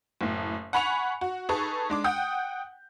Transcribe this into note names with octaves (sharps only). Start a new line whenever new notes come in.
F#1 A2
F#5 G#5 B5 C#6 C#7 F7
F#4
D#4 G#4 A4 B4 A5 C#6
G#3 D4 D6
F#5 G5 D#6 G6